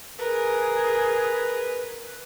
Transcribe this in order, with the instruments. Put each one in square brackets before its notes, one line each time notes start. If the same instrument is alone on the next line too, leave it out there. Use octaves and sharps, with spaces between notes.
[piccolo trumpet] G#4 [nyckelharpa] A#4 [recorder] B4